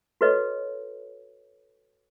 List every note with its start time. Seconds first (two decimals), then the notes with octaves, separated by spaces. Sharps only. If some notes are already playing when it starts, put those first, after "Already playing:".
0.21 F#4 A4 B4 C#5 D#5